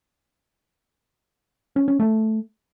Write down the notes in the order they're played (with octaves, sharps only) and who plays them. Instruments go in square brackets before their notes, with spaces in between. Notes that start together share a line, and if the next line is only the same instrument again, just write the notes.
[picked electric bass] C#4
C#4
A3